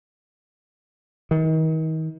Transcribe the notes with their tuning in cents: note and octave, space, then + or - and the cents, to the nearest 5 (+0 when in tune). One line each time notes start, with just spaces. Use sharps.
D#3 +35